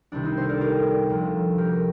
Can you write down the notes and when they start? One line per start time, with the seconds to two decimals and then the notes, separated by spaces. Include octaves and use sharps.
0.12 C2 C3 D#3 D4
0.25 C4 D#4
0.37 A4 C5
0.49 A#4 D5
0.61 G4 A#4
1.09 D2 C3 F3
1.58 G4 A#4